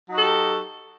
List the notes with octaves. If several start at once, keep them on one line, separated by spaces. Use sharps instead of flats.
F#3 D#4 F#4 G4 A4